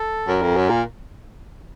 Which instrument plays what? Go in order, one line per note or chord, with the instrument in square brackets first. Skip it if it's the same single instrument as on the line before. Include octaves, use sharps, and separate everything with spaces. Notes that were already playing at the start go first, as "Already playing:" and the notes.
Already playing: [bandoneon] A4
[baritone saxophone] F#2 [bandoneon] A#4
[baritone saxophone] F2
F#2
A#2
[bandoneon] A#4